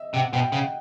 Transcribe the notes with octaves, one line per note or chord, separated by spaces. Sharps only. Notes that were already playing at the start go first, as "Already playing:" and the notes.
Already playing: D#5 E5
C3 F#5
B2 G5
C#3 F#5